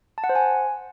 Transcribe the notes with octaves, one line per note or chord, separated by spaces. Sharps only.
A5
F#5
C5
G#5